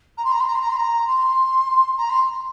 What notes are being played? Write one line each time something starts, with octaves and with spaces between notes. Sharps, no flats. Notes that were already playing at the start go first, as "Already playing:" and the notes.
A#5
C6
A#5
C6
A#5
C6
A#5
C6
A#5
C6
A#5
C6